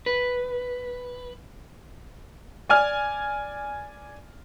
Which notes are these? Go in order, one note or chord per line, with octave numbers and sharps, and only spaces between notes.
B4
D5 G#5 F6